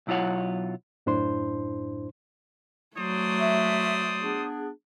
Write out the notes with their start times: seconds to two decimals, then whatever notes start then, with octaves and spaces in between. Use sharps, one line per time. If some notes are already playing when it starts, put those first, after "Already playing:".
0.07 B1 F#3 E4 F4 C#5 F#5
1.06 F#2 A2 D4 E4 C5 C6
2.97 F#3 A3 C5 D5 D#6
3.40 E5
4.22 B3 D4 G#4